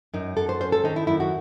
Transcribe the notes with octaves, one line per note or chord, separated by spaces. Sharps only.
F#2 D#4
F#2 A4
C5
C#4 C5
A4
D#3 D#4
E4
F#2 E4
F#4